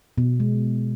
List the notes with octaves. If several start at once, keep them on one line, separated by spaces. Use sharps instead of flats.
B2
G#3